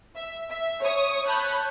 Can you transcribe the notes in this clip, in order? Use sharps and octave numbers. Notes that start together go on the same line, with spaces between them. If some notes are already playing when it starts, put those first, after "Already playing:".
E5
E5
C#5 C#6 D#6
C#5 A5 B5 F#6 G6